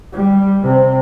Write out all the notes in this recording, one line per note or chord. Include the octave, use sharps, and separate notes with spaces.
G3
C3 C4